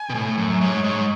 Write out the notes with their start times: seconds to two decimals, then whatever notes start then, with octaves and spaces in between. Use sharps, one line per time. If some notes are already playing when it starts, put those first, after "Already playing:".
Already playing: G#5
0.10 B2
0.14 A2
0.38 F#2
0.61 G#2 C#5
0.84 G#2